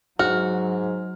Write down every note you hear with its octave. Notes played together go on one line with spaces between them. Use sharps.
G#2 F#3 F#4 F6